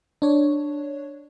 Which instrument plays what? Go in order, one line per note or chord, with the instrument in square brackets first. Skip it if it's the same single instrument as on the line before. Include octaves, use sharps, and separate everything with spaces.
[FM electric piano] D4 C#5